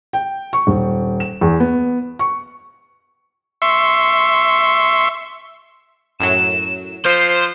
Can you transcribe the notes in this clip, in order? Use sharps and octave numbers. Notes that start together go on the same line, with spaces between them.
G5
C#6
D#1
E7
E2
B3
C#6
E5 C6 C#6
F#2 A2 F#3 E7
F3 C5 G6 B6 C7